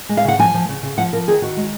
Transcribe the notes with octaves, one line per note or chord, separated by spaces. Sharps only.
G#3
F5
C#3 F#5
F3 G#5
F3
C#3
C#3
F3 F#5
F3 A#4
D#3 G#4
D#3 F#4
G#3